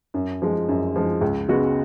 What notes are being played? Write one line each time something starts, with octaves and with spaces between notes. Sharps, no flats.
F#2
F3 G#3
F#2
F3 G#3
C#2
C#3 G#3 B3 F#4